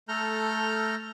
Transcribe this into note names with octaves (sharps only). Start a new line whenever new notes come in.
A3 A4 A#5 F6 G6